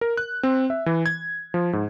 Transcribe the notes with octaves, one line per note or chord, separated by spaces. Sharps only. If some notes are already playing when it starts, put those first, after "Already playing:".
A#4
F#6
C4
E5
E3
G#6
F3
G#2